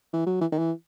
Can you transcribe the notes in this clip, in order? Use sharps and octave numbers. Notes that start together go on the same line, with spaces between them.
E3
F#3
E3
D#3
E3